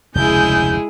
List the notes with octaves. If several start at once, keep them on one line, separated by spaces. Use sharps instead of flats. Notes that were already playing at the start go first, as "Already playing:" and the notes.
F1 D2 C#3 G#3 E4 G#4 G6